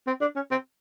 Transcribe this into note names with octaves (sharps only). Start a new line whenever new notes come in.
C4
D4
C#4
C4